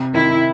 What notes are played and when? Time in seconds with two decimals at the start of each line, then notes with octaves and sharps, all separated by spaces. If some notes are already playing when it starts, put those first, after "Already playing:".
Already playing: C3
0.14 D#3 E4